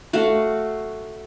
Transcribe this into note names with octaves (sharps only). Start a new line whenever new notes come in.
A3 F#4 F5